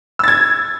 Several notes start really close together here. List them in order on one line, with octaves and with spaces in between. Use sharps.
E6 A6 G#6